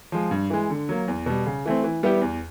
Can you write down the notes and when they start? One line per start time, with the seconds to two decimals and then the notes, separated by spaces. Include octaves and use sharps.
0.12 F3 G#3
0.31 G2
0.50 E3 G#3
0.70 D3
0.89 F#3 A#3
1.08 E2
1.26 B2 G3
1.46 C#3
1.66 E3 A3 C4
1.84 E3
2.03 G3 B3 E4 G4
2.22 E2